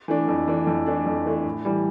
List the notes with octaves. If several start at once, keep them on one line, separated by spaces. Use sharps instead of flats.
E3 A3 D4
F2
E3 A3 D4
F2
E3 A3 D4
F2
E3 A3 D4
A2
E3 G3